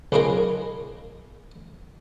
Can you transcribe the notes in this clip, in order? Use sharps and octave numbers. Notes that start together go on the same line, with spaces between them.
B1 C#3 D#4 F4 G#4 A#4